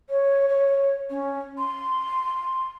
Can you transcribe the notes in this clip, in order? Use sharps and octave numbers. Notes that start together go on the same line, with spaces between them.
C#5
C#5
C#4
C6